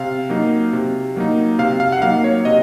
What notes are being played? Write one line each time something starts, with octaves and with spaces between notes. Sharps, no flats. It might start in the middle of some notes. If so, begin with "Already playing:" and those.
Already playing: C3 F5
F#3 A#3 D#4
C3
F#3 A#3 D#4
C3 F5
F5
F#5
F#3 A#3 D#4 F5
C#5
C3 D#5